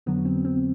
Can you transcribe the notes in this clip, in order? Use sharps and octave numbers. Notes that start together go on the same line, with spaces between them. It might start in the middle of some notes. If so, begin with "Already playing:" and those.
F2 D3 F#3 B3
C4
C4